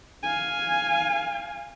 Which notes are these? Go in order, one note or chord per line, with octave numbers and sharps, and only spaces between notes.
F5 G#5